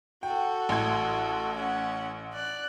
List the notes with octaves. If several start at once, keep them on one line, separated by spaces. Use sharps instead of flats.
F#4 A4 G5
A1 C6 G#6
C#4 F#5
D5 F#6